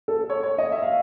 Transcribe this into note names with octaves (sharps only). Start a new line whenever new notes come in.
A4
C#5
C#5
D#5
E5
F5